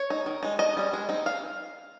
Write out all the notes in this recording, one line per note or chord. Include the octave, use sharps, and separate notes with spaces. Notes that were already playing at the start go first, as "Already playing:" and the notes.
Already playing: C#5
D#4
D#3
G#3 D#4
D#3 D#5
G3 C#4
G#3
C4 D#4
F5